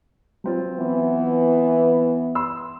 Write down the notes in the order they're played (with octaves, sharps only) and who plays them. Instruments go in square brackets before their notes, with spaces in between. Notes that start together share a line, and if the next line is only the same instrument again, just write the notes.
[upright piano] F#3 C4 F4
[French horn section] E3 B3
[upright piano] C6 E6